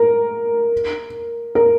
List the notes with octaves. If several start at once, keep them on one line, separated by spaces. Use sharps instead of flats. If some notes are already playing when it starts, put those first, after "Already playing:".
Already playing: A#4
A#4